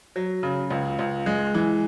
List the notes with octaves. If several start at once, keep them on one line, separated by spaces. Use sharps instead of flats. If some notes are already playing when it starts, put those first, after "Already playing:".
F#3
C#3
C#2
C#2
G#3
E3